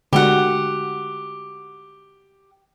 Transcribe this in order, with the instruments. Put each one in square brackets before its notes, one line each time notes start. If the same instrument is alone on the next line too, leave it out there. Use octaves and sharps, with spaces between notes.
[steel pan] D3 G#3 F#4 [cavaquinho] G4 F#5